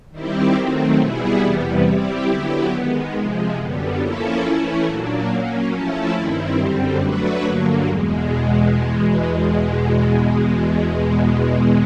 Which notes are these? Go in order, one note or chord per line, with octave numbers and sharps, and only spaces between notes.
D#3 G3 C4 E4 G4
D#3 F#3 A3 C4
B2 G3 B3 E4 G#4
E2 C3 E3 G3 B3
G3 C4 E4 G4
D3 F#3 B3 E4 G4
D#3 G#3 B3
C3 F3 G#3
F#2 D3 G3 B3
F3 A#3 C#4 E4 A4
E3 A3 C#4 E4
A#2 F#3 A#3 D4
F#3 A#3 C#4
F3 A3 C#4 E4 A4
G2 D#3 G3 C4 E4
F#2 D3 G3 C4
F#3 A3 D4 F#4 B4
G2 D3 F#3 A#3
E2 B2 G#3